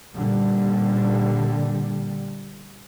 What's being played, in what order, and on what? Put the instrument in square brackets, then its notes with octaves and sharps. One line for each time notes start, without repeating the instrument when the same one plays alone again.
[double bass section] A#2 D3 G3